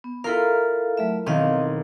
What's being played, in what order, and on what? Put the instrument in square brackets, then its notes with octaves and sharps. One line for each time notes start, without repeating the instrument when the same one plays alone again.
[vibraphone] B3
[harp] E4 F4 A#4 [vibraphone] A4 F5
[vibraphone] F#3 A3 E5
[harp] B1 D#3 [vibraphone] C4 D#5 F5